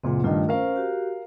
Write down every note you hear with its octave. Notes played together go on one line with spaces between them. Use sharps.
F#1 C#2 A#2 C4 F#5
G2 D#3 A3 F4 D#5
C#4 A#4 C5 F5
F#4 G4